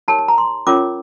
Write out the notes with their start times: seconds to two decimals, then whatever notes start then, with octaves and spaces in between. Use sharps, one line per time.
0.08 D#4 G4 A#4 C#5 A5
0.19 A5
0.28 A#5
0.38 C6
0.67 C#4 F4 A#4 C#5 D6